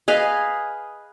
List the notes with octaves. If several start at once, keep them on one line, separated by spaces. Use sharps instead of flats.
G#4 B4 D#5 F5